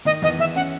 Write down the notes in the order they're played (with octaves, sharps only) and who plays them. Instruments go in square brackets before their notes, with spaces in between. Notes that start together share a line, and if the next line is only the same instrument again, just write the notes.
[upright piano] D#3 [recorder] D#5
[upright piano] E2 [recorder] D#5
[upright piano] E2 [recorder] E5
[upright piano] C#4 [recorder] F#5